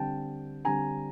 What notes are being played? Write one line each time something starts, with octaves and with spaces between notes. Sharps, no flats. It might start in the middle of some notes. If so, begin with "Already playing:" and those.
Already playing: D3 G3 C4 G5 A5
D3 G3 C4 G#5 A#5